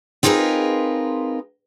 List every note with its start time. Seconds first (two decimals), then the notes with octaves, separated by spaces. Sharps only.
0.23 C4 D#4 F4 G#4 A#4 B4